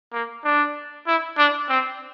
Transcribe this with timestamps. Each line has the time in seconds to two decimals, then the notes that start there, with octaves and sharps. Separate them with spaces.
0.13 A#3
0.45 D4
1.07 E4
1.38 D4
1.69 C4